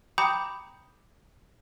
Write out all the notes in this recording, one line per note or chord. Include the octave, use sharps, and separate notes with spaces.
G5 A#5 B5 D6 D#6 G6